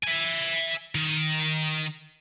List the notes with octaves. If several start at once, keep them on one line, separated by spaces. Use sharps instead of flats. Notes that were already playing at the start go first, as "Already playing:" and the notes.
E5 G#5
D#3